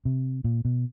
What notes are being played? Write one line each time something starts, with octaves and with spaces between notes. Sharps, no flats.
C3
A#2
B2